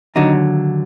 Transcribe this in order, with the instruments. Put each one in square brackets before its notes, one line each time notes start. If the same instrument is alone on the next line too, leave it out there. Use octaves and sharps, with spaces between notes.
[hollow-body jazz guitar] D#2 D3 F#3 D#4